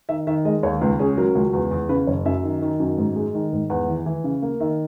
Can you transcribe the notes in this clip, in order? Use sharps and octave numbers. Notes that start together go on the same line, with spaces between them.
D#3 E5
D#3 E5
G#3 D#5
D#2 C#5
C#2 B4
C#4 G#4
F#3 A#4
C#2
E2
E2
C#3 B4
F#1 C#5
F#2 E5
D#3
D#3
F#2
G#2
G#3
D#3
G#2
E2 F#5
E3
E3
C#3
A#3
D#3 E5